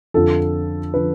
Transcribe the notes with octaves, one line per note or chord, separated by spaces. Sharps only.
F2 D3 F3 A4
D3 F3 B4